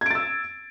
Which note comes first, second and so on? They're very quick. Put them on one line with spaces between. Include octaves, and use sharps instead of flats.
G#6 D7 A6 E6